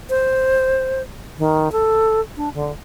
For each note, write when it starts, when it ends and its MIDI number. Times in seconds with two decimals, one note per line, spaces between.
0.10 1.02 72
1.38 1.72 51
1.72 2.20 69
2.37 2.49 62
2.54 2.72 50